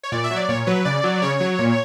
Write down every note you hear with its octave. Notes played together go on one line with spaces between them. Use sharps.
C#5
A#2 D5
E5
F#3
D5
A#2 C#5
F#3 B4
C#3 D5
F#3
C#3 C#5
F#3
A#2